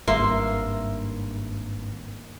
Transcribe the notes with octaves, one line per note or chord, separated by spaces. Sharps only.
G#1 G2 A#3 E5 C6